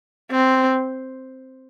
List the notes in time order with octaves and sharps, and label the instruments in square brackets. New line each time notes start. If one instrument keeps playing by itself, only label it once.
[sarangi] C4